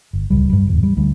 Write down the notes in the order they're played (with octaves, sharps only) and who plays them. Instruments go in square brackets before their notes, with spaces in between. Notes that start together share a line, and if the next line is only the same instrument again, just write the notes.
[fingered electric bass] G1
D#1 C#2 G3
G2 G3
D1 E2
G3
D2 G3